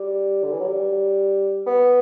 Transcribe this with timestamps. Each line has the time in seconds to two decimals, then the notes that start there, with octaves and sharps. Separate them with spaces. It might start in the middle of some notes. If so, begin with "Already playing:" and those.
Already playing: G3
0.44 D3
0.52 E3
0.60 F#3
0.67 G3
1.67 B3